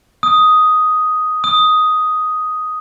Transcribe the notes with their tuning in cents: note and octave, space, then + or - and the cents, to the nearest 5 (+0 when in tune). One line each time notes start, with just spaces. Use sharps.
D#6 +5
D#6 +5